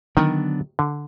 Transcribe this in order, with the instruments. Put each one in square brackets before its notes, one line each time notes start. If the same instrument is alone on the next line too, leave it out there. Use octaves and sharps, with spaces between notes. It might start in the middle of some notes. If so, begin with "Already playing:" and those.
[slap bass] D3 F#3 B3 D4 [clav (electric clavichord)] D#3
[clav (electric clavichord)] D3